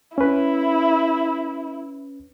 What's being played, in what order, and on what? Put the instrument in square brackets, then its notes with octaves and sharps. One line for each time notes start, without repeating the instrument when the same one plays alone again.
[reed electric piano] C#4 B4 [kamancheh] E4